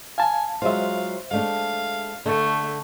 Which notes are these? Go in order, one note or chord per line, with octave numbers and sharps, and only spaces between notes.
F5 G#5 A5
F#3 G#3 F4 C5 E5 F5
G#3 A3 D4 F5
D3 A3